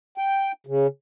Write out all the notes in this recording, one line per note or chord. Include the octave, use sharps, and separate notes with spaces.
G5
C#3